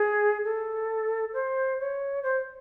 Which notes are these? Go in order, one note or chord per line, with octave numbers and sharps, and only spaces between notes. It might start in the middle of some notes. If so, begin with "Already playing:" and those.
Already playing: G#4
A4
C5
C#5
C5